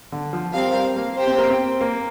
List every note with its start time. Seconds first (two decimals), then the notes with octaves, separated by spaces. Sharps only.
0.12 D3
0.33 F3
0.54 G3 C4 A#4 F5
0.75 G3
0.97 A#3
1.17 G4 C5 G5
1.27 C4
1.38 A#3
1.50 C4
1.81 A#3